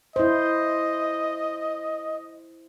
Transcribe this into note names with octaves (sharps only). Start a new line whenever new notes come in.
E4 C5 D#5